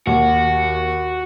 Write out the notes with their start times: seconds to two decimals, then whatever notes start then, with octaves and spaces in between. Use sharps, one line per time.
0.07 D#2 F#4